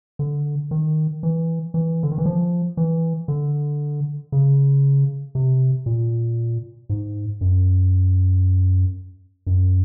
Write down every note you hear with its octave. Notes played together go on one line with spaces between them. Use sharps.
D3
D#3
E3
E3
D3
D#3
E3
F3
E3
D3
C#3
C3
A#2
G#2
F#2
F#2